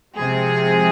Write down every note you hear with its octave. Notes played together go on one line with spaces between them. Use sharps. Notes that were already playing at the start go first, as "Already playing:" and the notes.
C3 F3 G#3 G#4